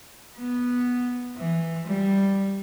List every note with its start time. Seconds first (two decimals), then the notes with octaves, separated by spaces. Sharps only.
0.38 B3
1.37 E3
1.87 G3